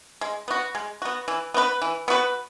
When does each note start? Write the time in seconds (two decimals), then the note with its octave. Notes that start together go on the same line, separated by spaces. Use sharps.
0.21 G#3
0.48 B3 F#4
0.75 G#3
1.02 B3 F#4
1.28 E3
1.54 B3 F#4 B4
1.82 E3
2.08 B3 F#4 B4